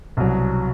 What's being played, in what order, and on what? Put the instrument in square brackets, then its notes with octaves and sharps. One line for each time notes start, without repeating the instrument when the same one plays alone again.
[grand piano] C2 B2 F#3